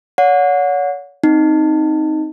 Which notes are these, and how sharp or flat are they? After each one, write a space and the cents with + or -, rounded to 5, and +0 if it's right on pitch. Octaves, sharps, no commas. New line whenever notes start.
C#5 +35 F#5 -30
C4 +0 D#4 +0